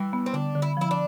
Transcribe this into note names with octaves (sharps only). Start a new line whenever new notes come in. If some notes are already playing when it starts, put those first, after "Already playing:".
Already playing: E3 G3
B3
C4
D3 D4
D3
E4
F3 E4
D4